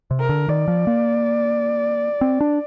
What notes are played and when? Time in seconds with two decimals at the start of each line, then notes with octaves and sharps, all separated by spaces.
0.11 C3
0.20 A#4
0.29 D3
0.48 D#3 D5
0.68 F3
0.87 A#3
2.21 C4
2.41 D4